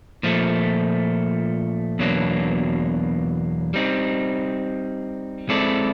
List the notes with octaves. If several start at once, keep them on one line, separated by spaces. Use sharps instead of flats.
A#2 F3 A3
E2 B2 F#3 A#3 D4
G3 C4 D#4
G#3 C4 E4 A4 D5